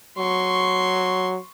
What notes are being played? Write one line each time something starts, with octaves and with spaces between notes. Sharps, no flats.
F#3 C6 C#6